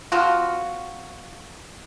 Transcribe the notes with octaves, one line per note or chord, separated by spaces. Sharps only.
F3 C4 F4 F#4